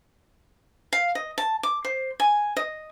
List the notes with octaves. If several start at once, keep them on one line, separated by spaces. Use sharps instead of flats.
F5
D#5
A5
D6
C5
G#5
D#5